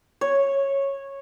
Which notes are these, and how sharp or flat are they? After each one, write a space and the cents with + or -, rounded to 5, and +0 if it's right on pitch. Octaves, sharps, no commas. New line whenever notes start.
C#5 -10